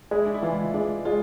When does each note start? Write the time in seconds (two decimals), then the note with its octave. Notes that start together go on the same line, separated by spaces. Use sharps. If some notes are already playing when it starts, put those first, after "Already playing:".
0.11 G#3 E4
0.25 D4
0.34 E4
0.43 E3 F4
0.74 G#3 D4
1.05 G#3 F4